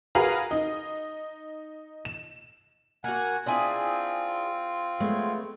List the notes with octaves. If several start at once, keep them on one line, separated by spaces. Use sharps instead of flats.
F#4 G#4 A#4 B4 F5 A#5
D#4 D#5
E7
A#3 F#4 F#5 G#5
C4 D4 E4 F4 G#4
G#3 A3 B3 C#5